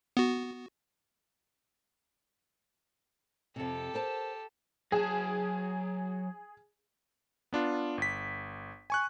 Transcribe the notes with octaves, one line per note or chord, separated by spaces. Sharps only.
B3 F#4
F2 C3 G4 A4
A#4 C5 A5
F#3 G#4 A5
B3 D4 F4
G1 B6
G#5 C#6 F#6